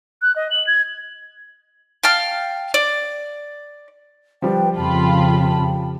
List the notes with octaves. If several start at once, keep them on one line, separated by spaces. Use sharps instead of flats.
F#6
D#5
F#7
G#6
F5 G5 A5 F6
D5
F3 G3 B4 G5
F2 C#3 F4 G5 A5 B5